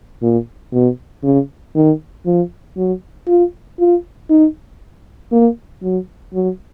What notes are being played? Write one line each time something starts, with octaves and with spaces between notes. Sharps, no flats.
A#2
B2
C#3
D#3
F3
F#3
F4
F4
D#4
A#3
F#3
F#3